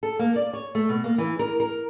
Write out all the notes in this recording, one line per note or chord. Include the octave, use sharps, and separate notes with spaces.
A4
A#3
D5
C#5
A3
B2
A#3
E3
A#4
A#4